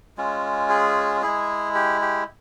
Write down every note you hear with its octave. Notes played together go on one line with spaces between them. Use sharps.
G#3 C#4 F4
G#4
G#3 E4 G#4
G4
G4